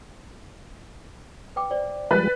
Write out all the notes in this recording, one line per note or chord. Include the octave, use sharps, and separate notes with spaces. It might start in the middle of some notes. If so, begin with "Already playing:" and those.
B4 G5 D6
C5 D5
F3 G3 G#3 B4 F#6 A6